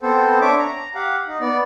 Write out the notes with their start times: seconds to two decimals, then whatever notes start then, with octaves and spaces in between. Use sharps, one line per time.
0.02 B3 C4 A4 C5
0.41 D4 C#5 E5 D6
0.59 A#5
0.95 G4 F5 F#5
1.28 D#4
1.41 B3 D5